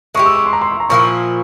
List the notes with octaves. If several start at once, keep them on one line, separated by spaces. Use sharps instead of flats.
G#3 E4 G4 C#6
E6
C#6
C6
A#5
C6
C6
A#5
A#2 F3 A#3 E4 C#6